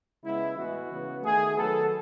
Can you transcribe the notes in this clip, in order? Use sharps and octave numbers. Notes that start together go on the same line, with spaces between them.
C#3 G#3 B3 E4
A2 E3 G#3 B3 F#4
C#3 E3 B3
D#3 A3 G#4
D#3 F#3 B3 A4